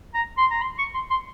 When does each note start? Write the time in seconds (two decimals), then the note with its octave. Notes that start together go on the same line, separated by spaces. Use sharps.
0.14 A#5
0.37 C6
0.50 A#5
0.62 C6
0.78 C#6
0.94 C6
1.10 C6